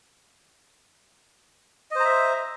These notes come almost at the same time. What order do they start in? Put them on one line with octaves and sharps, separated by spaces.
D#5 C5 A#5 E5